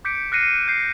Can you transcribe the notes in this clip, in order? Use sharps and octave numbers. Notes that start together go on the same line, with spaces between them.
D6 G6 B6 C#7 D7
F6 F#6 A#6 C7 C#7 D#7
G6 C7 C#7